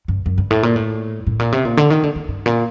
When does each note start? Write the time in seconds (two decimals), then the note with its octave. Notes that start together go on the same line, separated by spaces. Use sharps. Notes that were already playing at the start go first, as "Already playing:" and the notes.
0.08 G2
0.26 F#2
0.38 G2
0.51 A2
0.63 A#2
0.76 A2
1.27 A2
1.39 A#2
1.52 C3
1.65 A#2
1.77 D3
1.90 D#3
2.03 D3
2.15 D3
2.28 G2
2.46 A#2